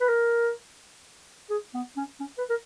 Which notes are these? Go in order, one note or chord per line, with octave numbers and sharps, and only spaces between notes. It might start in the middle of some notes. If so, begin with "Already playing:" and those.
B4
A#4
G#4
B3
C#4
C#4
B4
A#4